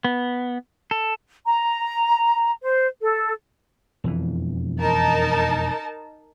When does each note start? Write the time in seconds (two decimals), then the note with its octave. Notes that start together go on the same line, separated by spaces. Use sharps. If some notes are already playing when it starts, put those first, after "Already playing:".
0.05 B3
0.91 A4
1.46 A#5
2.62 C5
3.01 A4
4.04 E1 F2 E3
4.80 D#4 A#4 A5